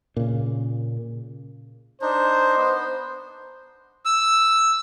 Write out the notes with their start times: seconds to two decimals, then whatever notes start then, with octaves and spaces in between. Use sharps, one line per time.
0.17 A#2 C#3
2.02 D4 D#4 C5
2.57 B3
4.05 E6